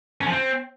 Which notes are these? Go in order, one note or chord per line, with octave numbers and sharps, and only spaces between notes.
C#4
F3
C4